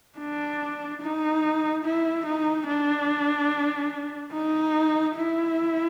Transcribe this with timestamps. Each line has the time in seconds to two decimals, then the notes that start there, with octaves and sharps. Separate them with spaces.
0.19 D4
1.02 D#4
1.85 E4
2.26 D#4
2.67 D4
4.33 D#4
5.16 E4